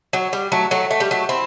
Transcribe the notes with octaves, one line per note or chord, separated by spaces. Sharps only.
F#3
G3
F#3 A3
F#3 A3
A3
G3
F#3 A3
C4 E4